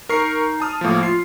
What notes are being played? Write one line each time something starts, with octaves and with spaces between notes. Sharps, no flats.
D#4 A#4 C#6 C7
A5 D#6 F6
A2 F3 A#3
F4 C7